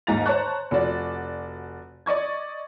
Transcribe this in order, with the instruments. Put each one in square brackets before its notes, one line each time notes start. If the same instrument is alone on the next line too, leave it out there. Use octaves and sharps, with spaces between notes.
[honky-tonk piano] D#2 G#2 G#5 A#5 A6 F7
C5 C#5 A5 A#5 C#6 F#6
F1 F#4 D5
D5 D#5 C#6 G#6